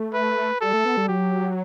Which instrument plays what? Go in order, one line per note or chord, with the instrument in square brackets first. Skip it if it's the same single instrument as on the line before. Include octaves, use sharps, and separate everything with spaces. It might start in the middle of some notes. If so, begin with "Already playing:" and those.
Already playing: [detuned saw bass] A3
[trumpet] B4
[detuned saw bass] G3 [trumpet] A4
[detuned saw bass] A3
B3
G3
[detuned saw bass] F#3 [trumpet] G4